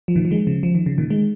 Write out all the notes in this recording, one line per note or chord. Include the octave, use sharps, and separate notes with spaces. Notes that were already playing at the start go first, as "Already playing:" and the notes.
F3
A#2 D#3
F3
D#3 G#3
C#3 F3
F3
D#3
C#3
A#2 D#3
D#3 G#3